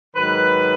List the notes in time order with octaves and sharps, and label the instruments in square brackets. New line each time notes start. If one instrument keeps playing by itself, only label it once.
[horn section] G#2 D#3 F#3 B4